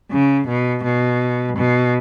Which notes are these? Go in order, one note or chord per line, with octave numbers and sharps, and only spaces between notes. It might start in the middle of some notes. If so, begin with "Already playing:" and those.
C#3
B2
B2
B2